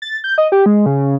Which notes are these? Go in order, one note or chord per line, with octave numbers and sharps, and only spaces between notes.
A6
G6
D#5
G4
G#3
C#3